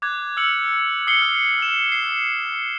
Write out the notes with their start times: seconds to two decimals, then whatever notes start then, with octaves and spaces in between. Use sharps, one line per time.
0.02 D6 F#6 G#6
0.37 E6 F6 C#7 F#7
1.07 D#6 C7 C#7 G7
1.22 F6
1.58 F6 E7
1.92 C7